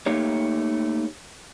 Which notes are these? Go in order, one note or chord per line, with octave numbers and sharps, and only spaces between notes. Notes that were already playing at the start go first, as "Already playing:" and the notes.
A3 A#3 D#4 G4 C#5